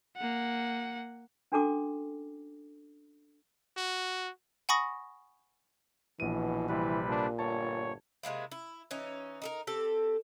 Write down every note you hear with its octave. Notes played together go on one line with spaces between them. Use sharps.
A#3 F#5
C#4 D4 F#4 A4 A5 D6
F#4
F#5 G#5 B5 C#6 D#6 A#6
A#1 B2 E3 D#7
C3 E3 G3 B4
A#2 D4
G1 C#5 A5
C3 G#3 A#3 E4
E4
E3 C#4 D#4
D#4 A4 A#4
C4 G4 A4